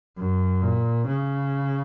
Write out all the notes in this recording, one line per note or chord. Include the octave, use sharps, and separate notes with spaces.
F#2
A#2
C#3